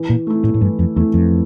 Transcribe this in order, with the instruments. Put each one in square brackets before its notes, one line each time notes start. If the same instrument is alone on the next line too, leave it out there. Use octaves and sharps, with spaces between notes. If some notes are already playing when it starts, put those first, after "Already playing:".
Already playing: [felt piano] E3
[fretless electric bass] A#2
[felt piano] A3 E4
[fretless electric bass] A2
A2
[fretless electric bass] G2 [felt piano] E3
[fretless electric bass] F2
[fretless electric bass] E2 [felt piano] A3 E4
[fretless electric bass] F2